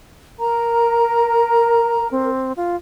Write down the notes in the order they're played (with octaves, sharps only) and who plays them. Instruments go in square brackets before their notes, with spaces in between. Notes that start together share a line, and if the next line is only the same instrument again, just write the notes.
[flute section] A#4 [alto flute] A#5
[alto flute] C4
F4